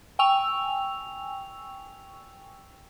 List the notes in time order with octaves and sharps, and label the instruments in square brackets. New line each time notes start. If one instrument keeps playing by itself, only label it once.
[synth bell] G5 G#5 C#6 E6 F7